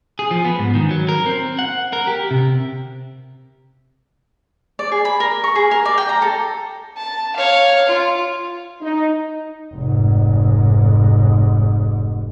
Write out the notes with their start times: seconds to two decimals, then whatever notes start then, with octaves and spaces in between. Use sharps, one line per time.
0.19 G#4
0.31 F3
0.45 B3
0.59 G#2
0.75 D#3
0.91 F#3
1.09 A#4
1.26 C4
1.59 F#5
1.93 A#4
2.07 G4
2.31 C3
4.79 D5
4.92 G#4
5.05 B5
5.20 A#4
5.44 C#6
5.55 G#4
5.71 A#4
5.85 D5
5.98 G5
6.09 A#5
6.22 A4
6.97 A5
7.37 C#5 F5
7.89 F4
8.81 D#4
9.74 F1 G#2